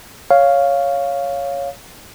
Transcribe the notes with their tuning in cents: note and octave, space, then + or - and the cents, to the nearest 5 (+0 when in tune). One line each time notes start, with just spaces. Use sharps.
C#5 +5 F5 +0